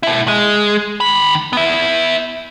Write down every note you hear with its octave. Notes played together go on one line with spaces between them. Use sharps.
B2 E4
G#3
D#3 B5
B3 E5